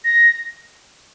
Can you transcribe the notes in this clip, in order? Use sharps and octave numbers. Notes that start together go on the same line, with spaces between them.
A#6